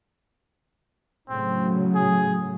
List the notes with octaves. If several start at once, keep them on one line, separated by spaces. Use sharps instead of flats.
A2 C#3 F#3 C4
G#4